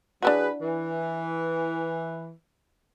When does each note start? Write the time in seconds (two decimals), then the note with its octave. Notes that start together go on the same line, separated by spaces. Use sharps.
0.22 F#3 D4 E4 F#4 G#4 B4
0.61 E3